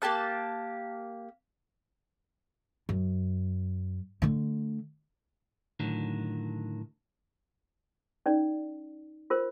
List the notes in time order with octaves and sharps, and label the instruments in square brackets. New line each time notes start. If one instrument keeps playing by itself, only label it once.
[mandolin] A#3 G4 A5 F#6
[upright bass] F#2
D3 A3
[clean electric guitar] A2 D3 D#3 F#3
[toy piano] C#4 D#4 D5
F4 A#4 C5